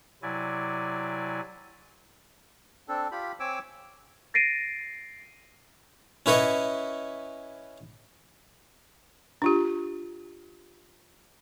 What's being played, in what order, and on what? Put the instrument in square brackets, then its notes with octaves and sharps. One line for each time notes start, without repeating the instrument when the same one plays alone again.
[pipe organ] C3 F#3 E4 D5 G#5
[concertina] C4 D4 A4
F4 G4 B5
C4 C#5 G#5 D6 E6
[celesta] A6 A#6 C7 D7 D#7
[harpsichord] C#4 E4 B4 C#5 D#5
[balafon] D4 F4 G4